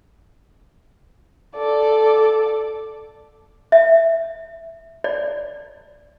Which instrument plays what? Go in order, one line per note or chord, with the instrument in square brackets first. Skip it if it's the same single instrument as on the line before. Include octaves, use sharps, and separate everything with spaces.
[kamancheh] A4 D5
[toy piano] E5
D5